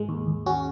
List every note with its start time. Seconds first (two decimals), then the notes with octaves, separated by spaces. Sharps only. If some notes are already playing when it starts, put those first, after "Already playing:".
Already playing: G#2 G#3
0.09 D#2
0.27 D#2
0.46 C#4 F#4